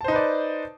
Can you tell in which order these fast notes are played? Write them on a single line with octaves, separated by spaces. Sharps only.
A5 C5 D#4 B4 D5